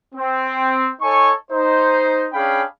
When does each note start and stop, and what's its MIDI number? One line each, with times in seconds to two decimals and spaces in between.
0.15 0.89 60
1.00 1.32 63
1.00 1.32 69
1.00 1.32 73
1.00 1.32 80
1.00 1.32 85
1.52 2.26 63
1.52 2.26 72
2.33 2.62 61
2.33 2.62 62
2.33 2.62 68
2.33 2.62 77
2.33 2.62 79
2.33 2.62 83